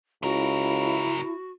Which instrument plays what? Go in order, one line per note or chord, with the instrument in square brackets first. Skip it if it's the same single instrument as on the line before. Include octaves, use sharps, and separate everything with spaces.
[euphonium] C#2 [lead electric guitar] C#3 A#4 [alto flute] E4 [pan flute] F#4